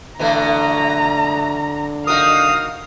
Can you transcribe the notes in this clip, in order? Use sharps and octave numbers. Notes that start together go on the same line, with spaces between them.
B2 D3 E3 A3 A#5
D#4 F#4 A#4 F5 D#6